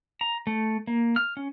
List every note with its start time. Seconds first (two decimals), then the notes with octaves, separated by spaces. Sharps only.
0.21 A#5
0.47 A3
0.87 A#3
1.16 F6
1.37 C#4